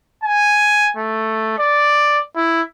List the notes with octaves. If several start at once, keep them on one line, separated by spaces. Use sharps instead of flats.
G#5
A3
D5
E4